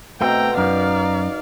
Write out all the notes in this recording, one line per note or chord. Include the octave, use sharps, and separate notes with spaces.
B2 A3 C4 G5 A#5
F#2 D#4 A#4 D5 F5